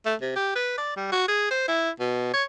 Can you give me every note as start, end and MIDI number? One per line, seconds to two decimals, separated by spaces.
0.06 0.15 57
0.21 0.32 48
0.36 0.51 67
0.55 0.73 71
0.78 0.96 74
0.96 1.10 55
1.12 1.27 66
1.28 1.49 68
1.51 1.67 72
1.68 1.90 64
2.00 2.31 47
2.34 2.43 73